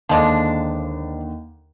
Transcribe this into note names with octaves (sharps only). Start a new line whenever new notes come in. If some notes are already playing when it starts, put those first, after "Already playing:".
D#2 D3 F3 G#3 D4